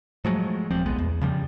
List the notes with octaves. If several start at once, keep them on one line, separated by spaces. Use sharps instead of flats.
F3 F#3 G#3 A3
D#1 F3 G3 C4
D1 B1 G#3 B3
E2
C#3 F3 G3